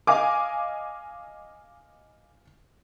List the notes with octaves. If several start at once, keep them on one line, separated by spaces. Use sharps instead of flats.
D#5 F5 G#5 D6